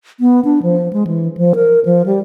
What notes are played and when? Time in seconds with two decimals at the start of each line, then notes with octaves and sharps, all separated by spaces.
0.20 B3
0.45 D4
0.63 F3
0.93 G#3
1.07 E3
1.37 F3
1.55 A#4
1.85 F3
2.06 G3